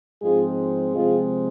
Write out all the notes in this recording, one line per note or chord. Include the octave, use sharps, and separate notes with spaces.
G#2 F3 G#3 C4 F4 G#4
C3 F3 G#3 C4 F4 G#4